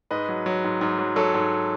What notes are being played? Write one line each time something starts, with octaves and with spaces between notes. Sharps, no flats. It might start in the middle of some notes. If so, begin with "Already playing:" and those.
G#2 B4 D#5
F#3
F#3
G#2
G#2
F#3
F#3 A4 C#5
G#2